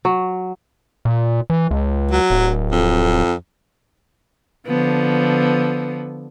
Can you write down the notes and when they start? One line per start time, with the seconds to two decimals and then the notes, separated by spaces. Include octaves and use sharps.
0.05 F#3
1.05 A#2
1.50 E3
1.71 C#2
2.11 F#3
2.31 D1
2.72 F2
4.67 D3 F3 B3